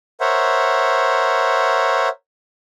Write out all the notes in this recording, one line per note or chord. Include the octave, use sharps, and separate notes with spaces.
A#4 C5 C#5 E5 F#5